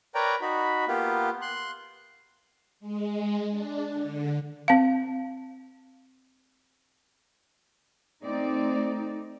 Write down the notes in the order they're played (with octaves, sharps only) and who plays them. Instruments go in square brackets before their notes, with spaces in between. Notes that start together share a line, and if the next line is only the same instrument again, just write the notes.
[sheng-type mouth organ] A#4 B4 C#5 D5 G5 A#5
D#4 F#4 B5
A#3 B3 F4 G4
C6 F#6
[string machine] G#3
D4
D3
[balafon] C4 F5
[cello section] A3 C4 D#4 D5